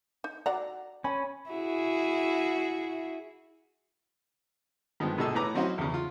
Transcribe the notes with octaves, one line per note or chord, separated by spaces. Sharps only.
D#4
F#4 D5 F#5 A#5
C#4 G#5 B5
E4 F#4 G#4
G2 D#3 F3 G#3 B3
A#1 B2 D#4 G#4 A4 E6
A2 B4 A#5 D6
F#3 C4 C#4 D#4 E4 F#4
E2 C#3
F4